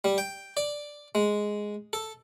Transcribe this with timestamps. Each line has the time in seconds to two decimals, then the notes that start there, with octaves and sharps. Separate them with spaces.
0.04 G3
0.18 G5
0.57 D5
1.15 G#3
1.93 A4